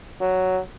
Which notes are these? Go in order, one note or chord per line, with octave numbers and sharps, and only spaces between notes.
F#3